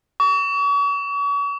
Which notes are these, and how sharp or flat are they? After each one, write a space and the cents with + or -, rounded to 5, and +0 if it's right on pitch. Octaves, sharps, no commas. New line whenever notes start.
C#6 +40